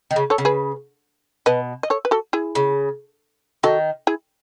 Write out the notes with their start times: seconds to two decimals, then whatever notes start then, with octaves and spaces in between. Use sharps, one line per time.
0.11 D#3
0.16 C#3
0.30 A4 C#5
0.38 C#3
0.45 G#4 B4
1.46 B2 B4 D#5
1.83 D#5
1.90 A4 C#5
2.05 B4
2.11 F#4 A4
2.33 E4 G#4
2.55 C#3
3.63 D#3 F#4 A4
4.07 E4 G#4